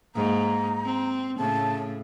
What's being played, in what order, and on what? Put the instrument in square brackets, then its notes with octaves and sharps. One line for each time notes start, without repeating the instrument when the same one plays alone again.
[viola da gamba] G#2 A#3 [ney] A#5
[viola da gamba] C4
[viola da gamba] A2 C#3 [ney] A5